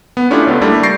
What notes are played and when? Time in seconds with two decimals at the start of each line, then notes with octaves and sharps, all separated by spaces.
0.17 B3
0.30 A3 C#4 D4 E4 F4 G4
0.47 C#2 B3 A4
0.61 G3 A3 A#3 D4 E4
0.83 C#6 G6 A6 A#6 C7 D7